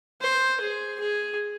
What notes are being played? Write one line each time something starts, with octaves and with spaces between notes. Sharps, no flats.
C5
G#4
G#4